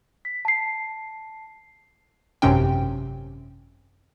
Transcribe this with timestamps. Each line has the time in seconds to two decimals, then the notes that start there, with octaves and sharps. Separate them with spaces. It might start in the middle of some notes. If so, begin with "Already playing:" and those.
0.25 B6
0.45 A5 C7
2.42 G#1 F#2 C3 C#4 G5